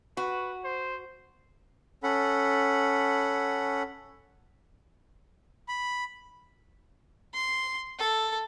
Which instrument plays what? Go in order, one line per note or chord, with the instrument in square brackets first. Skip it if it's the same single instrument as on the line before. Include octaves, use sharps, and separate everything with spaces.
[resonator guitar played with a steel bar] F#4 [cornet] B4
[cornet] C5
[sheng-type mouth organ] C#4 A4 F#5 B5
B5
[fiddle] C6
A4